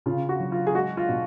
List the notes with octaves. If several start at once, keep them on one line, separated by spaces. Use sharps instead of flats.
C#3 F4
F#4
F#3
F4
G#4
G#3 F#4
F4
B2